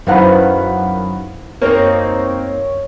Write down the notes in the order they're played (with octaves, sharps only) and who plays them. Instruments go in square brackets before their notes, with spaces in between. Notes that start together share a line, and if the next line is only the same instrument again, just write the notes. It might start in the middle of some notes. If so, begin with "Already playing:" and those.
[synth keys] F#2 D#3 [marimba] E4 B4 C5 [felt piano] F5 F#5 B5
[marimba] F#2 [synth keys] A#3 C4 D#4 [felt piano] A#4 C#5